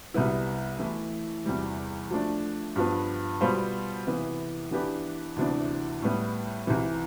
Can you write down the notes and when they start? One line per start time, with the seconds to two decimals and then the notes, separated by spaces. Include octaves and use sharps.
0.14 C2 C3 G3 B3 E4
0.79 E3 A3 E4
1.46 E2 C3 E3 G3
2.10 F3 A3 D4
2.76 G2 F3 B3
3.41 B2 G3 B3 F4 C5
4.06 C3 E3 B3
4.71 E3 B3 D4 G4 B4
5.36 D2 C3 E3 B3 D4
6.02 A2 G3 B3
6.67 C2 C3 E3